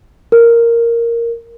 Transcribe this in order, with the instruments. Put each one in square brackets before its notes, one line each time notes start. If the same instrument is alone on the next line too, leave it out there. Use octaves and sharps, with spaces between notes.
[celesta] A#4